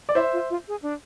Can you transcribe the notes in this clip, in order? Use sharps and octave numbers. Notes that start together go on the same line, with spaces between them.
D5
E4 C5 E5
F4
F4
G#4
D4